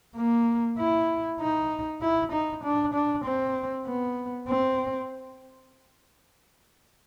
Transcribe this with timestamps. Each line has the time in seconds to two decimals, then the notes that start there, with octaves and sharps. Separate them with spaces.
0.16 A#3
0.78 E4
1.40 D#4
2.01 E4
2.32 D#4
2.64 D4
2.94 D4
3.25 C4
3.86 B3
4.48 C4